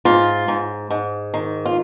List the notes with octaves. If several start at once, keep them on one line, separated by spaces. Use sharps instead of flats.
G#2 F4
G#2
G#2
D#3
F4